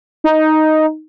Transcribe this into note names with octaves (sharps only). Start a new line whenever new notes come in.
D#4